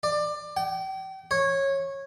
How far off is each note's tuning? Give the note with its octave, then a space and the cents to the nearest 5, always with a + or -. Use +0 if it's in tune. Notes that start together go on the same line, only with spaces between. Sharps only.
D5 +20
G5 -35
C#5 -15